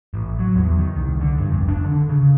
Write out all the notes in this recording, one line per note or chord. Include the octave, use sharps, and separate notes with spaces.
A1
F#3
E2
D#3
C2
D3
G2
F1
D4
D3
C#3